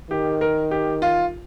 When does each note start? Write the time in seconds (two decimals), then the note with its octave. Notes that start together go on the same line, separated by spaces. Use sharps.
0.10 D#3 G4
0.41 A#4
0.71 G4
1.02 F4